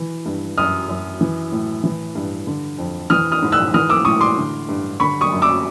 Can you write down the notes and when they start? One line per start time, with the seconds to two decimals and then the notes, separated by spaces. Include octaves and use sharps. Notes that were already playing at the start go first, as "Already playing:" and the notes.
Already playing: E3
0.26 G2
0.58 F#2 D#6 F6
0.89 F#2
1.21 E3
1.52 A2
1.84 E3
2.15 G2
2.47 D3
2.78 F2
3.10 E3 D#6 F6
3.32 D#6 F6
3.42 G#2
3.52 E6 F#6
3.74 E3 D#6 F6
3.90 D6 E6
4.05 A2 C#6 D#6
4.21 C6 D6
4.37 D3
4.69 G2
5.00 D3 B5 C#6
5.21 C#6 D#6
5.32 F#2
5.42 D6 E6